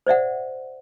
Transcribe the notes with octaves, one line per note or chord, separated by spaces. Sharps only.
C5 D5 E5 F#5